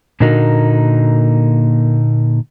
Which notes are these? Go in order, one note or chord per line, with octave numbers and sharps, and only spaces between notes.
A#2 D3 A#3 D#4 F#4 A#4